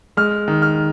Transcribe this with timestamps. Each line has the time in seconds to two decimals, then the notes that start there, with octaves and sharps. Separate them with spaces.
0.17 G#3 F6
0.48 D#3
0.62 F6